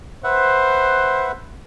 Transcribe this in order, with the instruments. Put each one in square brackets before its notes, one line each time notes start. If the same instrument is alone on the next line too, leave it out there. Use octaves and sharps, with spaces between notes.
[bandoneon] B4 E5 F#5 [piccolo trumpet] C5